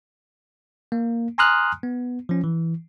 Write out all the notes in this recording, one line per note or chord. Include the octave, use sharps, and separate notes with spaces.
A#3
G#5 A#5 C6 D#6 F6 F#6
B3
F3 C#4
E3